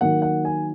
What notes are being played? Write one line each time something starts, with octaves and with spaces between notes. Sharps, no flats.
D#3 F#3 A#3 F#5
F#5
G#5